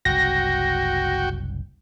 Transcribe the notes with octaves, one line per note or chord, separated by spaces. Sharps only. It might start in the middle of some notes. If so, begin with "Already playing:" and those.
F#1 C2 F#4 G5 A#6